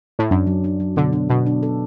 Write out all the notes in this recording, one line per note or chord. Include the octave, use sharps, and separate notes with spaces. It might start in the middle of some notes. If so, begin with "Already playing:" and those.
A2
F#2 D4
F#3
D4
F#3
B2 D3
D4
B2 D4
D4
A4